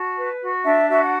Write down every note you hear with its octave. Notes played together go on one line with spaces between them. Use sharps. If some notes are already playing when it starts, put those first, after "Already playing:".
Already playing: F#4 A5
B4
F#4
D4 E5
F#4 E5
F#5